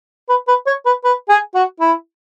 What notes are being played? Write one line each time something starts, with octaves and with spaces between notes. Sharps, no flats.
B4
B4
C#5
B4
B4
G#4
F#4
E4